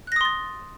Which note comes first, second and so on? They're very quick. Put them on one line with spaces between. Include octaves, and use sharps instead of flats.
F#6 A#6 D#6 C6 A6